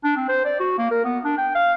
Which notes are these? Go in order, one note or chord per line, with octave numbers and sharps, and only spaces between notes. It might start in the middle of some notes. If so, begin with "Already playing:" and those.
D4
C4
C5
D5
F#4
A#3
A#4
B3
D4
G5
F5